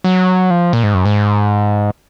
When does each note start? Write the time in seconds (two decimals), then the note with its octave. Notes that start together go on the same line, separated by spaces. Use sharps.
0.04 F#3
0.50 F3
0.73 A#2
0.83 G#2
0.94 F#2
1.05 G#2